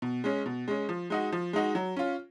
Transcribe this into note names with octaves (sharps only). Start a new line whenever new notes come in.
B2
G#3 C#4
B2
G#3 C#4
F3
G#3 D#4 F#4
F3
G#3 D#4 F#4
F#3
C#4 F4